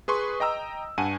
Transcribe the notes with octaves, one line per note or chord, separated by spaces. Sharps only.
G#4 B4 C6 C#6
D#5 G5 A#5 E6
G2 F#5 G#5 A5 D#7